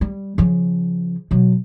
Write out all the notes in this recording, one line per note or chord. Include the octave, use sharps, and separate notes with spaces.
G3
C#3 F3
B2 F#3